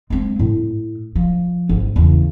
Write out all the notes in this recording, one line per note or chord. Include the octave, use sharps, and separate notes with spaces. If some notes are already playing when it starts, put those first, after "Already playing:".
G#3 C4
A2
F3
G#1
E2 C#3